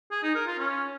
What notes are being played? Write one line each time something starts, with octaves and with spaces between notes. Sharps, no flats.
G#4
D#4
A#4
F4
C#4